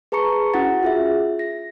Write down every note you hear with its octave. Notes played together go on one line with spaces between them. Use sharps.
G#4 B4 A5 A#5 C#6 C#7
C#4 E4 F#4 F#5 A6
F4 G#4 E5
A#6